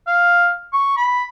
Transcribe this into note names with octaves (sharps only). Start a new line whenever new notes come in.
F5
C#6
B5